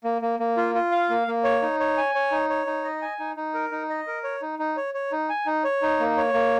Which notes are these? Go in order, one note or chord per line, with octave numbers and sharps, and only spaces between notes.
A#3
A#3
A#3
F4
F4
F5
A#3
A#3
C#5
D#4
C#5
G#5
C#5
D#4
C#5
D#4
D#5
G#5
D#4
D#4
A#4
D#4
D#5
A#4
C#5
D#4
D#4
C#5
C#5
D#4
G#5
D#4
C#5
D#4
A#3
C#5
A#3